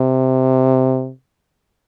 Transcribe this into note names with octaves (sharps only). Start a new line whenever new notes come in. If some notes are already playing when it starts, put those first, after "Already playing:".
Already playing: C3